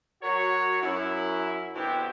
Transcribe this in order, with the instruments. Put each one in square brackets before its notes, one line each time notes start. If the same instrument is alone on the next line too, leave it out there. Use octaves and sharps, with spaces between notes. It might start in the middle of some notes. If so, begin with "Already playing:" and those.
[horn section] F#3 F#4 A#4 C#5
F#2 E4
B2 D3 C4 E4 G4